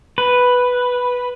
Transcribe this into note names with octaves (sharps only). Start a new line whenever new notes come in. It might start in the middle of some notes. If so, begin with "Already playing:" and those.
B4